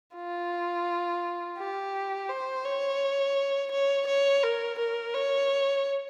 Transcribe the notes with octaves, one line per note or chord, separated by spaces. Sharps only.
F4
G4
C5
C#5
C#5
C#5
A#4
A#4
C#5